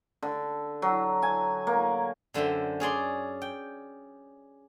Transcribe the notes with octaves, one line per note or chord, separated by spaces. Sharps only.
D3
F#3
G#5
A#3
F#2 D3 C5 E5 G5
C#4 G#4 D5 C6
G5